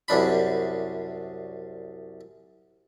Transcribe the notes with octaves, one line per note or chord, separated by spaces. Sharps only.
C2 F#2 D4 B5